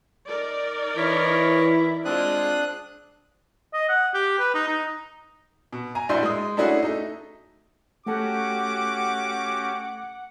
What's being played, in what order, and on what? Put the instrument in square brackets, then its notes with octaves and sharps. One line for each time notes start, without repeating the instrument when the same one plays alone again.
[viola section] D#4 A#4 D5
[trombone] E3 [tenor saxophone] E4 [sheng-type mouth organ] C#5 D#5
[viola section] G#3 F4 [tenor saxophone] C4 [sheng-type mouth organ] D4 D#6 F#6
[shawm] D#5
F#5
G4
B4
D#4
D#4
[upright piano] B2
G#5 A#5
A#1 D4 E4 F#4 C6 G6
G#3 D#6
A3 C#4 D4 E4 F#4 G#4
A3 D#4
[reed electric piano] A3 A4 [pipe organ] C#4 F#4 G4 [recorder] F#5 [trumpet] D6